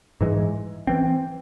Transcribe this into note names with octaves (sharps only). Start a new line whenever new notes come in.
G#2 E3 G#3
E3 C4